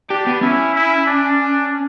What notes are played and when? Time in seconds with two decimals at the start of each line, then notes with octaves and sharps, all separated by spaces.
0.10 D4 G4
0.27 B3
0.41 C#4 E4
0.74 E4
1.06 D4